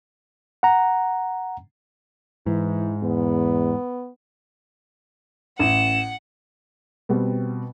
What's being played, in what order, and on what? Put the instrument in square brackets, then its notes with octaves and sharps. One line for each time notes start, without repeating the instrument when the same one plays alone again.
[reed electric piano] F#5 A#5
[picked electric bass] G#2 [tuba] E3 [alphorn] E4
[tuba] E2 [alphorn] B3
[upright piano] A1 [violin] F#5 [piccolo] E7
[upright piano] B2 G3 B3 C4